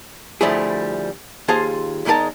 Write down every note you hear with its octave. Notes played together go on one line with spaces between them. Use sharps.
D2 F3 G3 A3 E4 G#4
D#2 F4 G#4 C5 F5 A5
E2 G#3 D#4 G4 A#4 A5